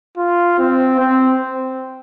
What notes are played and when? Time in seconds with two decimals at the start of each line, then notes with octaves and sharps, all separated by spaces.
0.18 F4
0.59 C4
0.99 C4